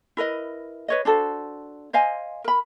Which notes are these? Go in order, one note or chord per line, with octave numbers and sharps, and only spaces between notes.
E4 A#4 B4 D#5
B4 C#5 D#5
D4 F#4 A4 C5
C5 D#5 F5 G#5
A#4 B5